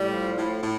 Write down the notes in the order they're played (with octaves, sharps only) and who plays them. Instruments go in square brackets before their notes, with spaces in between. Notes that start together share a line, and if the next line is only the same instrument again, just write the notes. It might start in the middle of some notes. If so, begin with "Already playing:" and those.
Already playing: [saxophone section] A2 G3
F3
A2
A2